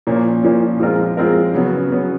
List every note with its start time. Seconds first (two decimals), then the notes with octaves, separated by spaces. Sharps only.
0.07 A#2 F3 A#3 C#4
0.43 A#2 F3 A#3 C#4
0.80 F3 G#3 C4 F4 A#4
1.17 F3 G#3 C4 F4 A#4
1.54 C#3 F#3 B3
1.90 C#3 F#3 B3